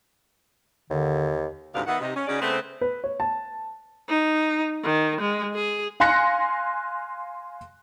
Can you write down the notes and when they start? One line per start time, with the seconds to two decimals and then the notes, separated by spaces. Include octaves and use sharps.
0.90 D#2 D3
1.74 D2 G#2 C3 B3 D4 F5
1.86 D#3 B3 D#5 E5 F#5
2.00 C3 D#4
2.16 C#4
2.27 C#3 C#4 D#4 F#4 G#4 D5
2.41 C#3 A3 B3 C4
2.81 B4
3.04 C#5
3.20 A5
4.09 D#4
4.84 D#3
5.21 G#3
5.55 G#4
6.00 F5 G#5 C6 F#6 A#6 C#7